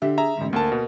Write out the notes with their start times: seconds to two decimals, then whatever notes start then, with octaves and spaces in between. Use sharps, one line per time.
0.02 D3 D4 G4 E5
0.18 G#4 E5 A#5
0.37 A1 G#2 D3
0.53 D2 A#3 A#4 A5
0.72 B2